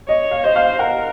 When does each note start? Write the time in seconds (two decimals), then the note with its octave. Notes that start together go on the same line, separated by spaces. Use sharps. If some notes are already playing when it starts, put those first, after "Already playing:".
0.08 C#5 D#5
0.31 F5
0.44 C5 D#5
0.56 F5
0.79 A#4 F#5